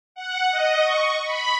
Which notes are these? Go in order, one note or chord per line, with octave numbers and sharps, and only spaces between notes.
F#5
D#5
C#6
B5